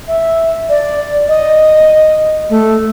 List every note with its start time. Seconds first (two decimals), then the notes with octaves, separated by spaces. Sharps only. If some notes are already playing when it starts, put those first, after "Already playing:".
0.08 E5
0.69 D5
1.28 D#5
2.50 A3